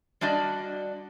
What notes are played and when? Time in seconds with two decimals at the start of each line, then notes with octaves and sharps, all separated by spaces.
0.21 G3 D4 F#4 D5 D#5